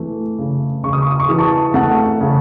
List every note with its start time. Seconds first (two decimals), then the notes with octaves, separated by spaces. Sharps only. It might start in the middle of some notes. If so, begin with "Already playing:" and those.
Already playing: E3 A3
0.39 C#3
0.84 C#3 C#6
0.93 D#6
1.02 C#6
1.11 D#6
1.20 C#6
1.29 E3 D#6
1.38 A5 C#6
1.74 A3 F#5 A5
2.21 C#3